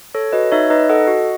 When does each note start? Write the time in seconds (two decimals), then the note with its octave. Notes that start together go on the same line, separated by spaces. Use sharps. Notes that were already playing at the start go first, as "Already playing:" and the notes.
0.14 A4 C#5
0.32 F#4 B4 D#5
0.52 D#4 C#5 E5
0.70 D#4 B4 D#5
0.89 A4 D#5 F#5
1.08 F#4